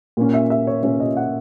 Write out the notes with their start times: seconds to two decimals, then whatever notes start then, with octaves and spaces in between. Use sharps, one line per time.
0.17 A#2 A#3 C#4
0.34 E5
0.50 E5
0.67 C#5
0.83 A#2 A#3 C#4 C#5
1.00 D#5
1.17 F#5